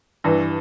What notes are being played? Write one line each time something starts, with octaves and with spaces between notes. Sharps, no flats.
G2 E3